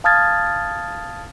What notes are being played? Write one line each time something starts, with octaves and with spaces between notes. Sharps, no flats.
F5 A5 D#6 F6 G#6 A6